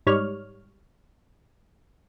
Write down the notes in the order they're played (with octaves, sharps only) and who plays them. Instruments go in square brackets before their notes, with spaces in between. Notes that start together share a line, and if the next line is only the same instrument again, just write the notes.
[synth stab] G#2 G3 C#5 F6